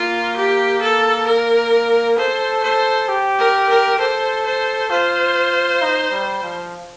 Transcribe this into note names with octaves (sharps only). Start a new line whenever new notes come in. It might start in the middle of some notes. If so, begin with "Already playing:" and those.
Already playing: A#3 F4
G4
A4
A#4
A4 C5
C5
G4
A#4
A#4
A4 C5
C5
F4 C5
D#4
G3
F3